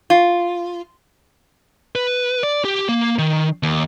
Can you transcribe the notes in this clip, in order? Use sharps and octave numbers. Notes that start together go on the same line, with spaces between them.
F4
B4
D5
G4
A#3
D#3
D#2